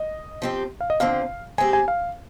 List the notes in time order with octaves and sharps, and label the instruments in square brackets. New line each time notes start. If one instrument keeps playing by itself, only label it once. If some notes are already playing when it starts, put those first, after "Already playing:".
Already playing: [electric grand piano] D#5
[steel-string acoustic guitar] F3 C4 G4
[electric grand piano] F5
D#5
[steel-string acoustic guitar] F2 D3 F3 C4 [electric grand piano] F5
[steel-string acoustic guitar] G#3 C4 G4 [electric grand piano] G#5
[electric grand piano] G#5
F5